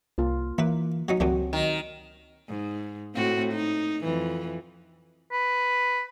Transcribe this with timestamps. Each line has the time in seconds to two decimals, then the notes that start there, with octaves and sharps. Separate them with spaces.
0.18 C2 A#3 F4
0.58 E3 A#3 E4 B4
1.09 F#3 C#4 D#4
1.20 C#2 F#2 E3 F#3 C4 D4 F#4
1.53 D#3
2.48 G#2
3.15 A2 C4 F#4
3.52 D#4
4.03 F2 E3
5.32 B4